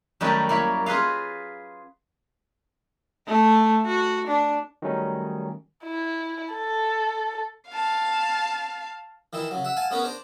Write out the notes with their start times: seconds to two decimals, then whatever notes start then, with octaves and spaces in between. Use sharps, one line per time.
0.21 F#2 D#3 G3 A3 D#4 B4
0.49 A#3 E4 C#5 B5
0.86 F4 G#4 B4 D#5 F5
3.27 A3
3.86 F#4
4.27 D4
4.82 D#3 F#3 G3 A3 C#4 D#4
5.85 E4
6.54 A4
7.69 F5 A5
9.33 D#3 E3 D#4 E4
9.51 C#3 F#3
9.64 E5 F#5
9.77 F5 F#5 G#5 A5
9.91 G#3 B3 C#4 A#4 B4 C#5
10.04 D4 C5 A#5